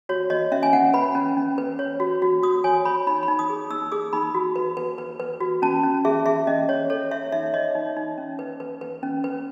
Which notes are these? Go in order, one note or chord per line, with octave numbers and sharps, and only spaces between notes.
F#4 C#5
C#5 D#5
C#4 E5
G#5
C#4 F#5
B4 B5
C#4
C#4
B4
C#5
F#4
F#4
F#4 D#6
C#5 G#5
C#5 B5
D#4 B5
B5
D#4
D#6
G#4
D#4 E6
G#4 D#6
D#4 B5
F#4
B4
B4
B4
B4
F#4
C#4 A5
C#4
G#4 E5
G#4 E5
C#4 D#5
C#4 C#5
A4 C#5
C#5 E5
D#4 E5
C#5 D#5
D#4
D#4
C#4
B4
B4
B4
C#4
B4